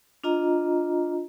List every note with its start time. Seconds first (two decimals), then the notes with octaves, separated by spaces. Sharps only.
0.24 D4 F4 D#5 A#5